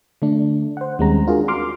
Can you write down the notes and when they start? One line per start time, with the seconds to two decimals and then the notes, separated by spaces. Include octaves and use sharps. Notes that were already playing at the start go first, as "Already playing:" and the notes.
0.22 D3 A3 D4
0.77 C5 F#5
0.99 D#2 G3 G#3 C4 C#4 A#5
1.27 D4 F4 F#4 G#4 A#4
1.48 C6 D6 F6